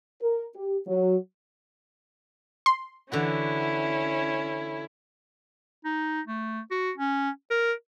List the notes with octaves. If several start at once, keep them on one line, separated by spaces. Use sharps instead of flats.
A#4
G4
F#3
C6
D3 E3 C#4 E4 F#4
D#4
A3
F#4
C#4
A#4